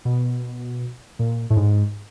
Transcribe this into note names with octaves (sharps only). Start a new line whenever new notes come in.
B2
A#2
A2
G#2